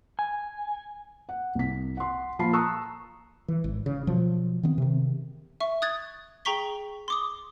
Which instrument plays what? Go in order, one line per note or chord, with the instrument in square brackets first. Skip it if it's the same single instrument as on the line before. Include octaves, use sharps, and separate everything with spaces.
[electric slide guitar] G#5
[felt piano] F#5
C2 B6
F#5 C6
A#2 F3 F4 A5 B5 C7
A5 A#5 C#6 D#6 E6 F#6
[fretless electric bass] E3
G#1
C#3
B2 F3 F#3
D#3 E3 B3 C4
C3 D#3
[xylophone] E5 C#6
D#6 F#6 G#6 A6
G#4 G5 A#5 C#6 B6 G7
C6 D6 D#6